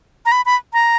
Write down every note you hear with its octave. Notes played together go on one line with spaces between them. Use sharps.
A#5
B5
B5
A#5